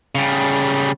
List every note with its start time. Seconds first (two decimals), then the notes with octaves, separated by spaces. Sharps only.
0.15 C#3 G3